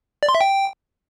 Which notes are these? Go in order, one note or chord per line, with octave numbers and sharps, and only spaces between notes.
D5
C6
E5
G5